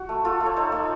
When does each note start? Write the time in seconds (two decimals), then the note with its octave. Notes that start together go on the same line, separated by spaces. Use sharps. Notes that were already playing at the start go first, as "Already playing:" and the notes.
Already playing: F#4
0.09 A3
0.24 A3 F4 A4
0.40 A3
0.46 C#5
0.56 D#4 A4 C5
0.72 A3